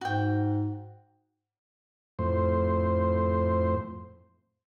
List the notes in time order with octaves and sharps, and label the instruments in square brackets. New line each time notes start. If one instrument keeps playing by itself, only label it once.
[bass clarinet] G#2 [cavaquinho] F#4 G5
[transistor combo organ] F2 A2 C5